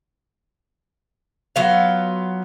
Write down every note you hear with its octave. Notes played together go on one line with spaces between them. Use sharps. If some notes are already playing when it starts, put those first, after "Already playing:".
F#3 B3 F4 F5